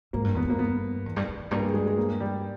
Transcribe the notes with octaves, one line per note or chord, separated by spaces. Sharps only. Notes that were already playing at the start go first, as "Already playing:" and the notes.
G#2 A#3
G2
E2 B3
G2 A#3
B3
E2
G2
E2
E2
G2 A#3
G#3
G#3
G#3
A#3
G3